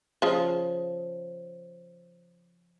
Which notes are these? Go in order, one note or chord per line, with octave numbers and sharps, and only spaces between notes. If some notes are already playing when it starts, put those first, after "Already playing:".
C#3 F3